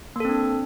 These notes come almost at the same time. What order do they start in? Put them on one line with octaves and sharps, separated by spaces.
A#3 A4 C4 D4